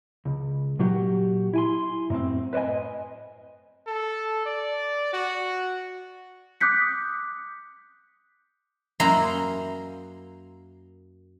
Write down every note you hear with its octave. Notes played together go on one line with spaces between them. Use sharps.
C#2
A#2 F#3 F#4 G4
E4 G#5 C6
F#2 A2 C4
B4 C5 D5 D#5 G#5
A4
D5
F#4
D6 D#6 F#6 G6 B6 C#7
F#2 A#3 E4 D#5 A#5 C6